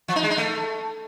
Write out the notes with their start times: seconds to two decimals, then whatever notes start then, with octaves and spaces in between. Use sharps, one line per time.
0.08 F3
0.16 D#4
0.23 G#3
0.30 D#4
0.38 A3